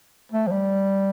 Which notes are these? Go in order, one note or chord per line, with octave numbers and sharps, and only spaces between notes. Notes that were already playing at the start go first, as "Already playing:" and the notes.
A3
F3
G3